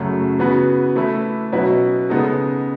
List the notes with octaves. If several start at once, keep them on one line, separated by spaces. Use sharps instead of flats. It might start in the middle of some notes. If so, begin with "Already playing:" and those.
Already playing: F#2 C#3 F#3 A3
C#3 E3 B3 F#4 B4
E3 A3 E4 B4
B2 F#3 C#4 E4 B4
C#3 G#3 B3 D#4 A4